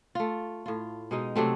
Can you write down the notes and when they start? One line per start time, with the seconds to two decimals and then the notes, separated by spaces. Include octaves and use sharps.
0.15 A3 F4
0.66 A2 F4
1.11 B2 G#3 D#4
1.36 C3 F#3 A3 C4